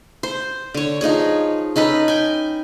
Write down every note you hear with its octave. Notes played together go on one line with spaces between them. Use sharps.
C5
D3 C#5
F3 D#4 G#4 C#5
C#4 D#4 A4 B4
G5 G#5